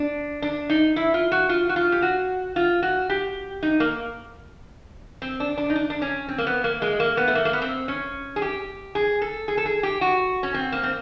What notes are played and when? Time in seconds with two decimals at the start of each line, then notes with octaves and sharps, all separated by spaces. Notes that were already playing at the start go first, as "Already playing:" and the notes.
Already playing: D4
0.42 D4
0.69 D#4
0.96 E4
1.14 F4
1.32 F#4
1.49 F4
1.69 F#4
1.76 F4
1.92 G4
2.02 F#4
2.56 F4
2.83 F#4
3.10 G4
3.62 D#4
3.80 A#3
5.22 C4
5.40 D4
5.58 D4
5.70 D#4
5.75 D4
5.90 D4
6.02 C#4
6.28 C4
6.38 A#3
6.47 B3
6.64 A#3
6.82 G#3
7.00 A#3
7.17 B3
7.28 A3
7.35 A#3
7.45 A#3
7.53 B3
7.62 C4
7.88 C#4
8.36 G#4
8.42 G4
8.95 G#4
9.22 A4
9.48 G#4
9.57 A4
9.66 G#4
9.83 G4
10.01 F#4
10.43 C#4
10.54 C4
10.72 A#3
10.83 C4